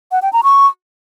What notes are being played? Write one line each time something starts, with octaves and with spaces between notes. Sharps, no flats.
F#5
G5
A#5
C#6